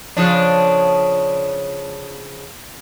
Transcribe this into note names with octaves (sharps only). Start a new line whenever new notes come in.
C#3 F3 D4